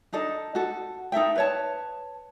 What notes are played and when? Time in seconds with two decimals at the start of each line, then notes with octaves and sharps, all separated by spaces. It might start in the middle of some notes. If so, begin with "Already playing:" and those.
0.13 D4 D#4 A4 D#5
0.55 F#4 A4
1.12 D#4 A4 E5 G5
1.36 B4 C#5 A5